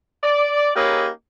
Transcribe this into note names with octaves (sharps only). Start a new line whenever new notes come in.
D5
A#3 C#4 D#4 G4 G#4 B4